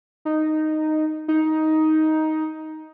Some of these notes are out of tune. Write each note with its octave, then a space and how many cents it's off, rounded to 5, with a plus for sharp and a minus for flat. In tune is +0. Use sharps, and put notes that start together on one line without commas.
D#4 -5
D#4 +10